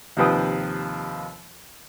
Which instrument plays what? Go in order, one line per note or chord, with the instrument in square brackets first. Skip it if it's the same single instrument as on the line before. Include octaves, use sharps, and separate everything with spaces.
[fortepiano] D#2 C3 F3 B4 G5 D#6